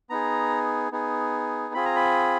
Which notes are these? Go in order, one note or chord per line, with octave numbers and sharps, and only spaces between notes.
B3 D#4 G#4 A#5
B3 D#4 G#4
C4 F4 G#4 B5
A#5
B5